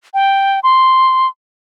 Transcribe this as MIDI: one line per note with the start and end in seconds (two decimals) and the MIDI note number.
0.14 0.60 79
0.63 1.27 84